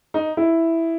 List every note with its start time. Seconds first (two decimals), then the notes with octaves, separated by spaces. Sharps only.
0.14 D#4
0.37 E4